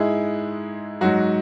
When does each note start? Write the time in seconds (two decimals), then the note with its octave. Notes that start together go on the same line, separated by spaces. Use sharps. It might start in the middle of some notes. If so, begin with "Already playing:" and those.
Already playing: G#2 G#3 E4 G#4
1.01 G#2 F#3 F#4